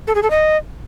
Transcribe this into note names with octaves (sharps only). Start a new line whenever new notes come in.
A4
G#4
A4
D#5